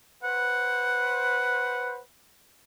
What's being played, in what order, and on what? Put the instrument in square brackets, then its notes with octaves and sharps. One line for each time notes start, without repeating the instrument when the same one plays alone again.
[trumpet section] B4 C5 [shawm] F#5